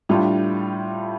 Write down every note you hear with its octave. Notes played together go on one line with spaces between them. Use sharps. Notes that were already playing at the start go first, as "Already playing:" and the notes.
A2 G3 D4 F4